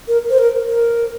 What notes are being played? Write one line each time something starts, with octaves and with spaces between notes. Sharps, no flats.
A#4
C5
A#4
A#4